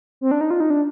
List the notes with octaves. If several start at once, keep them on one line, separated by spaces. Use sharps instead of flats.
C4
D4
D#4
F4
D#4
D4